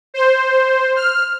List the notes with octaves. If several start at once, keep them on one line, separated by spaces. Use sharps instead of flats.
C5
F6